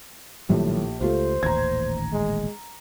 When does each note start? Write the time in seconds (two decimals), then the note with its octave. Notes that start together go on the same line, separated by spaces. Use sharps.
0.49 A#1 A2 D#3 F#3 G3 G4
1.01 C#2 A3 F4 G4 C5
1.43 D#1 A1 D#2 A#5 G#6
2.13 G#3